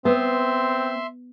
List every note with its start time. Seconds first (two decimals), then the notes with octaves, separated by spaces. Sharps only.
0.05 B3 C4 E5 C6